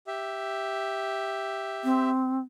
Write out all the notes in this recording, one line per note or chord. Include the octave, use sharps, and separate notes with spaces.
G4 E5
C4